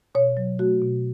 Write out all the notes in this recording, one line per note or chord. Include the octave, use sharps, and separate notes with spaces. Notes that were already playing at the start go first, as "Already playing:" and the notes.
B2 C#5
F#3
A3 F#4
B2